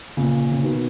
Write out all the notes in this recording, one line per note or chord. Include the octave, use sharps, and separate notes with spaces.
A#2 C#3
C#3
B2 D#3